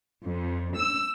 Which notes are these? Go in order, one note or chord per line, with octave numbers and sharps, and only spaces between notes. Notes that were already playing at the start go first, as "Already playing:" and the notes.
F2
E6